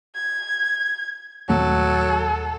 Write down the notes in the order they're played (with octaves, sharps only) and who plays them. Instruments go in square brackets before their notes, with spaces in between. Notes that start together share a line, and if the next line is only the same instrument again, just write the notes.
[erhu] G#6
[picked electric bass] D#1 A3 [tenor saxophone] F#3 [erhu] A4